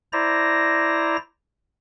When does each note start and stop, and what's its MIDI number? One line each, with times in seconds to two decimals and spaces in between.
0.13 1.17 64
0.13 1.17 72
0.13 1.17 74
0.13 1.17 82
0.13 1.17 94